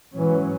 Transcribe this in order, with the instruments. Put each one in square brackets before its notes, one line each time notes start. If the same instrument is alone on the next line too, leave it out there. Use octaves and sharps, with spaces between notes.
[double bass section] G#2 F#3 C#4 [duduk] E3